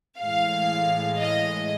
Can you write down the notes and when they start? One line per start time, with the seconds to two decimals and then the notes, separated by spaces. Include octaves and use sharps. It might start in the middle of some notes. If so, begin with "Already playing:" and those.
0.21 A2 E3 G#3 F5
1.20 D#5